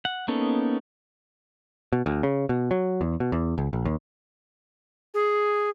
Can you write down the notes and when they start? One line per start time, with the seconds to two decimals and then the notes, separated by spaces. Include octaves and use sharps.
0.05 F#5
0.28 A#3 B3 C#4 D#4 A4
1.93 B2
2.06 D2
2.23 C#3
2.49 B2
2.71 F#3
3.01 E2
3.20 B2
3.32 E2
3.58 C#2
3.73 A#1
3.85 D#2
5.14 G#4